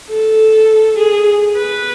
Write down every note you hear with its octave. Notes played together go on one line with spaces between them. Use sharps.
A4
G#4
B4